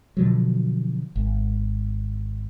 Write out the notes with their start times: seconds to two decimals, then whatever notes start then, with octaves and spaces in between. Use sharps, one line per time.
0.17 B2 D3 F3 F#3
1.16 G#1